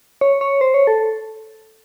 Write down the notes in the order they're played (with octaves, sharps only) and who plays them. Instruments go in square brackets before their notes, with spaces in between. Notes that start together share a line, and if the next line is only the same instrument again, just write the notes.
[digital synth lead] C#5
C#5
C5
C#5
A4